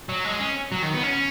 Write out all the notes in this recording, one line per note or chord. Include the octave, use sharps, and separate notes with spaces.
F#3
G#3
C#4
F#3
D#3
B3
C#4